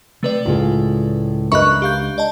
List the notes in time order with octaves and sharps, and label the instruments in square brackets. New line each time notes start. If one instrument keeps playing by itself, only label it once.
[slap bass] C3 [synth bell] A3 B4 D5
[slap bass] C#2 [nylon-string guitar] A2 F4 G#4
[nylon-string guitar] D4 A#4 D#5 [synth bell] B4 E5 B5 [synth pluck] C#6 F#6
[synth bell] G4 F5 G6
D5 D#5 A5